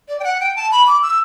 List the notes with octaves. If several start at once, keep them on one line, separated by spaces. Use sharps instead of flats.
D5
G5
F#5
G5
A5
B5
D6
E6